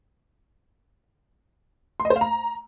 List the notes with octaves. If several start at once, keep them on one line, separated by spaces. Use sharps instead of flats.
C6
D#5
C5
F5
A#5